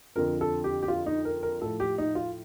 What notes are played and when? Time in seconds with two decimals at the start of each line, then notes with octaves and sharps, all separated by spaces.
0.16 F2 D3 F3 A#4
0.41 A4
0.64 G4
0.83 G4
0.88 F4
1.06 D#4
1.25 A#4
1.43 A#4
1.62 A2 F3 A4
1.80 G4
1.98 D#4
2.15 F4